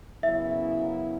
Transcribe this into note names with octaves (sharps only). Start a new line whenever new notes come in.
F#2 C#3 F#3 B3 E4 E5